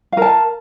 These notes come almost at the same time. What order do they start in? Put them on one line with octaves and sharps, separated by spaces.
F5 A#4 A5